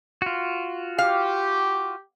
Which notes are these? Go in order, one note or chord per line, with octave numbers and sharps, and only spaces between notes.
F4 F#4
G4 F5